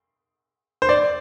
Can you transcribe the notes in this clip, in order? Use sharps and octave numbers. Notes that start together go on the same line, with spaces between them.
C5
D5